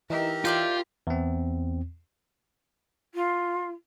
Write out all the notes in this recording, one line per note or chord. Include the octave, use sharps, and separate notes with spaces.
E3 D#4 G4 A#4 E6
E4 F4 D5 G5
E2 C4
F4